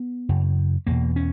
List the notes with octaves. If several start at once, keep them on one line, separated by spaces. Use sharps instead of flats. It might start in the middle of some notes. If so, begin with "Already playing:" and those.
Already playing: B3
F#2 C#3
E2 B2 A#3
C#4